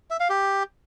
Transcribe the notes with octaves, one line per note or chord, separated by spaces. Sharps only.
E5
F5
G4